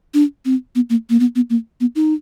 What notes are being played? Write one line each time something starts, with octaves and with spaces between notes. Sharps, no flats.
D4
C4
B3
A#3
A#3
B3
B3
A#3
B3
D#4